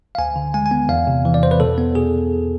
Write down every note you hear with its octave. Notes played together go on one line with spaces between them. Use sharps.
F5
D2 G#5
D3
G#3 G#5
G#5
B3
E2 F5
C3
E3
D5
E2 C5
B4
B2 A4
B3
B2 G#4